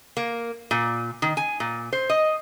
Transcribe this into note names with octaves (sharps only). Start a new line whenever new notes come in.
A#3
A#2
D#3
G#5
A#2
C5
D#5